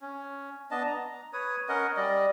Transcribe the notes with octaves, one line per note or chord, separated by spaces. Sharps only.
C#4
B3 D4 D#5 A5
A#5
B4 C#5 D#6
C#4 A#4 D#5 F#5
G3 D5 D#5